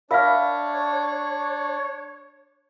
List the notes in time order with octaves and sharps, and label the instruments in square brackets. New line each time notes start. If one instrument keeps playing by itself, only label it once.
[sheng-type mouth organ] D4 [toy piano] A#4 E5 F5 [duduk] C#5 [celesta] B5 F6